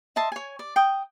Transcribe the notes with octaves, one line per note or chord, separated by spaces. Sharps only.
D#5 E5 A5 C6
C#5 G#5
D5
G5 D#6